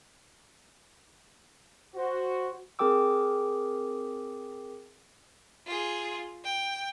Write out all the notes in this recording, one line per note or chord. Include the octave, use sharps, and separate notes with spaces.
F#4 C5
C4 G#4 A#4 G5 D6 E6
F4 G#4
G5